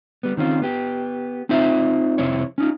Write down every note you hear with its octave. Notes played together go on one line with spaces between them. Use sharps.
G3 B3
D#3 C4 C#4 F4
B3 G4
C4 D#4 F4 C5 E5
C2 F2 C4 E4 C#5
C#4 D#4 F4